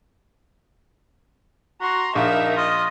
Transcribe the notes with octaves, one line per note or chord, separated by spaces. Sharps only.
F#4 A#5 C6
A#1 D#4 A#4 E5
F4 D#5